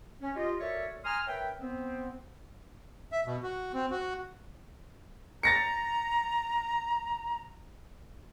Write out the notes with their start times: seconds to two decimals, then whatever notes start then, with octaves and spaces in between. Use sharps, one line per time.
0.21 C#4
0.36 F4 G4 D#5
0.61 F#4 A4 A#4 C#5 D5 E5
1.05 G#5 A#5 C6 D#6 F6
1.27 A#4 B4 C#5 E5 G5
1.60 B3 C4
3.12 E5
3.26 B2
3.43 F#4
3.73 C4
3.91 F#4
5.43 A#5 A6 A#6 C#7